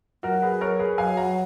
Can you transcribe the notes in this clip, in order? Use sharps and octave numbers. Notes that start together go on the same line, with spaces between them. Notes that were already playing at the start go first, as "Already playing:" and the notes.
F#3 F#4 A#4
G#4 B4
A#4 C#5
G#4 B4
F#3 F5 G#5
F#5 A#5